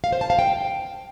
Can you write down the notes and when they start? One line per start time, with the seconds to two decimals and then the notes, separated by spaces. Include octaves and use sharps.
0.04 F5
0.12 C5
0.21 A5
0.30 F5
0.39 G5